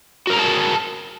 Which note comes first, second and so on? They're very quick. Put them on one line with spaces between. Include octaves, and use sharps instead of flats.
F#4 A#4 A#5 G#4 A5